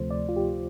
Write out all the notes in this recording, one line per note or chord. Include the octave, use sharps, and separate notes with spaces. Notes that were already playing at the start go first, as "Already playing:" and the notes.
Already playing: D2 C3 F3 A3 C5
D5
F4
G4